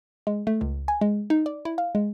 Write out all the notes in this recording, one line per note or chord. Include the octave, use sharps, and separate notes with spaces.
G#3
A3
C#2
G#5
G#3
D#4
D5
E4
F5
G#3